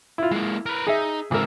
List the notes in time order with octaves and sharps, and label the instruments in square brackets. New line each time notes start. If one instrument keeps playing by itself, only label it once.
[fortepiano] E4 F4
[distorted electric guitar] G#3 A#3 [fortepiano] E4
[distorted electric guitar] A#4 B4
[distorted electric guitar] D#4 [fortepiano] G#4 E5
[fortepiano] G#1 A#4 [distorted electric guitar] C#2 E5